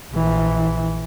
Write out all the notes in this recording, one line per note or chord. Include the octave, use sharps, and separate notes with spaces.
A#1 E3